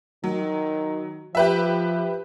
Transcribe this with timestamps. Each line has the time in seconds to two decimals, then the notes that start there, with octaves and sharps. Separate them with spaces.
0.24 D#3 F#3
1.35 F3 G4 B4 E5